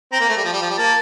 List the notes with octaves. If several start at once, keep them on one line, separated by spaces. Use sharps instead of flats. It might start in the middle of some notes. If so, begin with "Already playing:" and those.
C4 A#5
A#3
A3
G3
F3
G3
F3
G3
A#3 A5